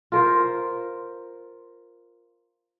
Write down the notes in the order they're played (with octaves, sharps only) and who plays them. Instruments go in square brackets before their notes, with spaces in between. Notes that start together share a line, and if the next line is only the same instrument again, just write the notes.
[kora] F4 A#4 C5